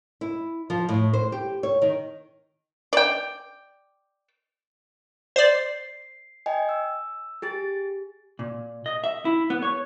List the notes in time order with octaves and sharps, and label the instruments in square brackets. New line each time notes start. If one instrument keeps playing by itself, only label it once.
[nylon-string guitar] E4
F3
A2
C5
G4
C#5
D#3
[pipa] D5 G5
[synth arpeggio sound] C5 D5 [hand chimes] C7
[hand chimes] D#5 G5 G#5
E6
G4 G#4 A6
[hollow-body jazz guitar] A#2
D#5
E5
E4
B3
C#5